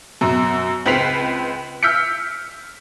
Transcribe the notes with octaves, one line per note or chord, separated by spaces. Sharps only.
F#2 B2
C#2 C4 B4 B6 C7 F7
E6 F6 G6 B6 C#7